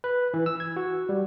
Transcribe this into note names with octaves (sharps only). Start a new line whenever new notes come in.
B4
E3
E6
G#6
F#4
G3